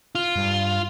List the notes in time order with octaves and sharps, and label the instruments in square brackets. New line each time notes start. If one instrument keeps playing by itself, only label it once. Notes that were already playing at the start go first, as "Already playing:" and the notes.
[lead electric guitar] F4
[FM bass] G2